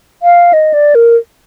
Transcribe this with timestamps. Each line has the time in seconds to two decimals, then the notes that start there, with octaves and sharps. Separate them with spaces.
0.23 F5
0.53 D#5
0.74 D5
0.95 A#4